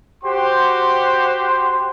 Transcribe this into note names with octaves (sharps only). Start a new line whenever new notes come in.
F#4 G4 C5 C6